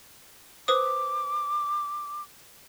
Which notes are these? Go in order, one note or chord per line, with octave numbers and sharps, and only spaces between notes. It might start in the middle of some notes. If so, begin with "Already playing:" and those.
B4 C5 D6 D#6